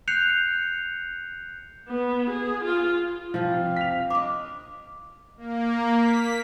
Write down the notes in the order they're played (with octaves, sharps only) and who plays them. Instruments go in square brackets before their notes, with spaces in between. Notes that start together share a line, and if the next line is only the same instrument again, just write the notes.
[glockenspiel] F#6 G6 C7 C#7 F7
[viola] B3
G#4
F4
[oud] C3 G3 [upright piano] F3 [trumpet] F5
[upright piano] B6 F7
[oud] D4 D#5 [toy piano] B5 D6
[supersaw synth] A#3
B6